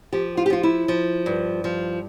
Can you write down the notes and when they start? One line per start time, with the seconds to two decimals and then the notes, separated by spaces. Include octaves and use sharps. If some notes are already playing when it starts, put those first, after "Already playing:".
0.13 F3 G4
0.37 F4
0.46 G4
0.50 F3 F4
0.63 E4
0.88 F3
1.26 G2
1.64 F3